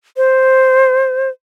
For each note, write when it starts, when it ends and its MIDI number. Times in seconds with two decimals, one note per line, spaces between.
0.17 1.29 72